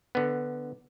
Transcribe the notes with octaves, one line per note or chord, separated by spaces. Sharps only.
D3 B3